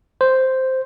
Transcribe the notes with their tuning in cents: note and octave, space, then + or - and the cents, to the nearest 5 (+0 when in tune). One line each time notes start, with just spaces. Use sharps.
C5 +0